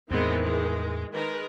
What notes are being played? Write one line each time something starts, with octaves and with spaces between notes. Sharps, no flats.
E2 A2 D#3 E3 G#3 B3 C4
G#3
D#3 G#3 A#4 B4